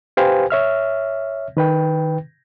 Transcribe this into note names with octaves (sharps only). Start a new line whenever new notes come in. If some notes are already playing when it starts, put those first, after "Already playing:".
G4 B4 C5 F5 G5 G#5
C#5 E5 F6
D#3 B4 G5